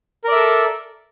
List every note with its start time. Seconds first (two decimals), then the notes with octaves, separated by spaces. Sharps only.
0.24 A#4
0.28 D5
0.32 E5
0.36 A4